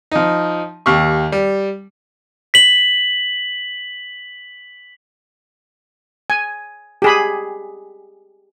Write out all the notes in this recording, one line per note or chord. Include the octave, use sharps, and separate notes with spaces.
F3 D#4
D#2 G4 C#6
G3
B6 F#7
G#5
G4 G#4 B5